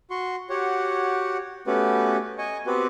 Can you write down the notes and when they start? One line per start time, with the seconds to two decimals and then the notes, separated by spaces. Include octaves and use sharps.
0.10 F#4 C6 C#6
0.50 F#4 G4 C#5 F#5
1.67 A3 B3 C#4 F#4 G4 B4
2.38 D#5 G#5 C#6
2.67 B3 C4 F#4 G4 B4